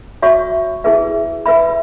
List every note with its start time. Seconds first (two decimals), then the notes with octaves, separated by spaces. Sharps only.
0.22 F#4 C#5 E5 C#6
0.84 E4 G#4 B4 E5
1.46 B4 E5 B5